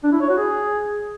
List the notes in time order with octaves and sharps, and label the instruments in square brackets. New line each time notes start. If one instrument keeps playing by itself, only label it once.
[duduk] D4
E4
C#5
F#4
G#4